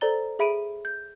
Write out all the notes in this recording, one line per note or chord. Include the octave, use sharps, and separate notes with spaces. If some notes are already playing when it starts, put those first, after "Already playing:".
A4 C5 D5 A#5 A6 G7
G#4 E5 B5 D7 D#7
G6